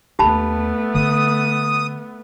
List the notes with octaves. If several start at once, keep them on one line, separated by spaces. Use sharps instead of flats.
D#2 A3 B3 D4 G4 A5 B5
D3 D#4 D#6